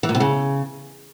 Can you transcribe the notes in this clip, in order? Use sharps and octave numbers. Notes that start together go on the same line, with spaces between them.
E3
A#2
C3
C#3